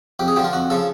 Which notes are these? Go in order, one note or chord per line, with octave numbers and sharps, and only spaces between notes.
F2 G4
G#4
D3 F3 G4
F4
F2 F#4
C#3 F3 A4